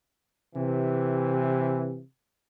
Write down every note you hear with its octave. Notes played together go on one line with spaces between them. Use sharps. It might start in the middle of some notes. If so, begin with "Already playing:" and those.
C3 E3